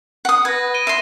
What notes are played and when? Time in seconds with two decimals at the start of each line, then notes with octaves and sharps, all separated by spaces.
0.25 F#5 D#6
0.45 B4 G#6 A#6
0.74 D7 D#7 G7
0.87 E5 C6